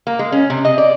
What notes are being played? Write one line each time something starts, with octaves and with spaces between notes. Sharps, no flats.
A#3
G#3
C#4
C3
D#5
D5